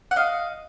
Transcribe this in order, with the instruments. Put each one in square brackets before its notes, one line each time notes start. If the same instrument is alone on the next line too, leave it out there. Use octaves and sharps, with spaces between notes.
[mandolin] F#5
D#5 F5